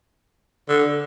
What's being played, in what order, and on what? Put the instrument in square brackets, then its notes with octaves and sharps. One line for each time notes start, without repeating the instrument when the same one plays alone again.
[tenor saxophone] D3